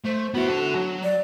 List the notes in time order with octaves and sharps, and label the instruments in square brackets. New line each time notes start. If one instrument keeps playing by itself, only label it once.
[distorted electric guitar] A3 [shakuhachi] C5
[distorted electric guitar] B3 E4 [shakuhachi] F#4
[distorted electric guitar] D3 A5
F#3
[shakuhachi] D5